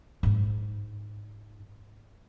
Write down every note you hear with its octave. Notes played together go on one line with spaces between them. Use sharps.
G#2 D#4